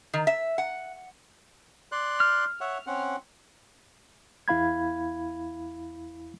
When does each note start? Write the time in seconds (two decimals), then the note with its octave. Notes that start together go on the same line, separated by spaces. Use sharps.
0.14 D#3
0.27 E5
0.58 F#5
1.92 D5 C6 F#6
2.20 F6
2.61 C#5 E5 F#5
2.87 C4 C#4 F#5
4.48 E2 E4 F5 B5 G#6